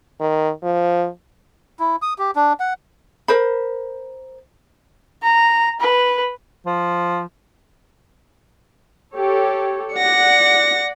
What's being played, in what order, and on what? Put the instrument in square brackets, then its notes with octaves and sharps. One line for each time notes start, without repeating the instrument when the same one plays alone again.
[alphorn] D#3
F3
[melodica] E4
D#6
G4
D4
F#5
[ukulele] A#4 C5 B5
[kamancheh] A#5
B4
[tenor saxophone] F3
[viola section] G4 A4 C#5
[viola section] D5 F#5 [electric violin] A#6 C#7